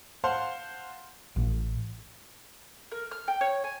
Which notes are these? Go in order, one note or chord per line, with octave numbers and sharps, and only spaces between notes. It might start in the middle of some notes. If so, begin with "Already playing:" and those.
C5 F5 F#5 A5 C6
A1
A#4
F6
G5
C#5
G#5